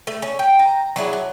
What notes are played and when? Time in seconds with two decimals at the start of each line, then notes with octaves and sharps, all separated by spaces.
0.07 A3
0.22 C#4
0.39 G5
0.59 A#5
0.96 F#3 D4 E4 G#4
1.13 F#3